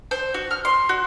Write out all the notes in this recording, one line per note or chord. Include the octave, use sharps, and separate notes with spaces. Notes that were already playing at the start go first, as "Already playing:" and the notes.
C5
F#4
F6
C6
F#4